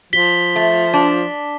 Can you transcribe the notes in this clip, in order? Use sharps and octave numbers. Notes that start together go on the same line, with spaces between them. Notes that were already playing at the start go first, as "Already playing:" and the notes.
F3 B6 G7
A3
D4